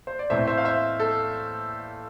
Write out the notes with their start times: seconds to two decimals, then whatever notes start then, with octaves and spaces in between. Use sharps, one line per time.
0.07 C5
0.19 D5
0.30 A2 E3 A3 C4 C5 E5
0.47 C5 E5
0.58 F5
0.65 C5 E5
1.00 A4